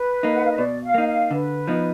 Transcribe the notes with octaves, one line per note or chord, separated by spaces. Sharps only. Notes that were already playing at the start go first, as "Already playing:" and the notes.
Already playing: B4
A#3 D#4
F#5
F5
D#5
B2 D5
F5
A#3 D#4
F5
D3 B4
F3 B3 D#4